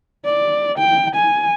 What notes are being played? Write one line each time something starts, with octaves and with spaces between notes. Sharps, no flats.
D5
G5
G#5